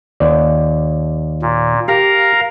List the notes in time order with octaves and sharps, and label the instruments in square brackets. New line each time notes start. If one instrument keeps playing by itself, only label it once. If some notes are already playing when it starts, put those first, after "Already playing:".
[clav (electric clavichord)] D#2 D5
[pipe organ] A#2
[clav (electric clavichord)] G4 [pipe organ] A#4 F5 A#5